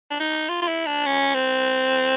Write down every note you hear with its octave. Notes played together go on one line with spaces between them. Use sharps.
D4
D#4
F4
F4
E4
D4
C#4
C4